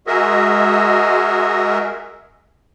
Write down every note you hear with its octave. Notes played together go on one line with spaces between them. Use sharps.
G#3 F#4 G#4 A#4 D#5 E5